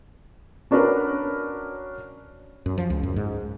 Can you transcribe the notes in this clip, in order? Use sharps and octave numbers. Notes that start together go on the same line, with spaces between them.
C#4 D4 F#4 A#4 B4 C#5
F#2
F3
C#2
F#2
G#2